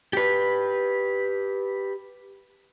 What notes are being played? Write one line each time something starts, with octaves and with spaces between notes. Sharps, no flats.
G4 B4